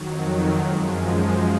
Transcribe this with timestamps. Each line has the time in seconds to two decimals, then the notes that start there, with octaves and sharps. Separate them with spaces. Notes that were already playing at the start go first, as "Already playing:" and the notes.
Already playing: F2 D#3 F#3
0.58 F#2 F3 G#3